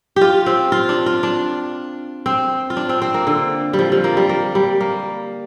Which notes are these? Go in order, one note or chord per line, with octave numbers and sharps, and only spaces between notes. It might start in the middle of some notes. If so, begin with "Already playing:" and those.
F4 G4
C4
F4
D4
F4
D4
C4
F4
D4
C4
C4
A#3
D3
G3
F3
F3
A#3
G3
A#3
G3
A#3